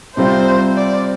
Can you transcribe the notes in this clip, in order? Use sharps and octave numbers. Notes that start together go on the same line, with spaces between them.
C3 G3 C4 F4 C5
D5